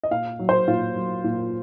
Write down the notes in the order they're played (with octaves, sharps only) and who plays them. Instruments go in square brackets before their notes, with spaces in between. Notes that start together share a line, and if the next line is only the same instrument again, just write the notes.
[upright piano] D#5
A#2 F5
F#3
C5
A#2 F4
F#3
A#2